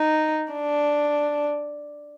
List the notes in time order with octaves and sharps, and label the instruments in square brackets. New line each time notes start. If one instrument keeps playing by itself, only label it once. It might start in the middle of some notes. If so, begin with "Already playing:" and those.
Already playing: [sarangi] D#4
D4